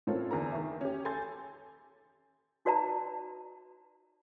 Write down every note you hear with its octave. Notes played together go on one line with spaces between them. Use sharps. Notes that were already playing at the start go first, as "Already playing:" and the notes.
A2 C4 C#4 F4 A4 A#4
E2 D3 A#3 A#5
D#3 E5
C#4 G4
A4 G#5 C6 G6 A6
D#4 F#4 B4 D5 A5 A#5